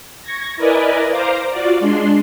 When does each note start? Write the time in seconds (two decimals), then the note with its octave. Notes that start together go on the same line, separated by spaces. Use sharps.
0.23 C#6 G#6 A#6
0.57 E4 A#4 B4 D5 D#5 G#5
1.10 C5 F5 A#5 D6 A#6
1.50 F4 F#4 D5
1.80 G#3 D4 C6